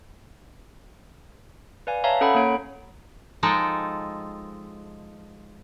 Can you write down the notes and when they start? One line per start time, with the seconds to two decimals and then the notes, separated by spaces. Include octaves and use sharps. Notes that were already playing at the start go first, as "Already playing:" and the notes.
1.87 B4 D5 F5 G#5
2.04 C#5 E5 F5 A5 A#5
2.21 C#4 A4 F#5 A#5 B5
2.35 A#3 C#4 A4 C#5 D7
3.43 F3 G#3 D#4 A4 G5